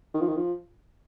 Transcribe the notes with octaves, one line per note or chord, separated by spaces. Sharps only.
D#3
F3
D#3
F3